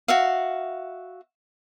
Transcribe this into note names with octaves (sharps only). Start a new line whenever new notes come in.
F#4 E5 F5